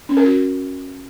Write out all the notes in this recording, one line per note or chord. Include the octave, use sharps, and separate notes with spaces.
C#4
A#4
F#4